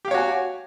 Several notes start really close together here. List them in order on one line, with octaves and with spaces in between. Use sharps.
G4 F5 C#5 F#4 G#5